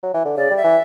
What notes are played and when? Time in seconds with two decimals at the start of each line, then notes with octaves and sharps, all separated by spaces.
0.03 F#3
0.14 E3
0.25 D3
0.37 C#3 D5
0.50 G3
0.57 E5
0.64 E3